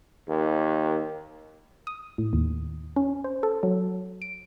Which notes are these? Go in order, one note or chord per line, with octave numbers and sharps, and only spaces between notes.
D#2
D#6
A2
D#2
C#4
C5
A4
F#3
D7